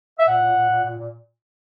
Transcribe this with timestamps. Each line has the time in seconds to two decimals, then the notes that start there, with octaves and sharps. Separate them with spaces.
0.18 E5
0.28 A#2 F#5
0.42 A#2
0.56 A#2
0.70 A#2
0.84 A#2
0.98 A#2